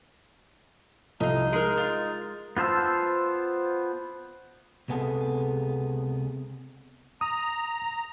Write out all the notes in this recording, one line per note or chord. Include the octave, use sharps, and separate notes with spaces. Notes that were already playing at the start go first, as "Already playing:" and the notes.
C2 F3 D#4 A4 D#5 F5
G#3 A#4 D#6
F4
B3 F4 C5 A5 E6
C#2 C3 B3 G#4 A4
A#5 D#6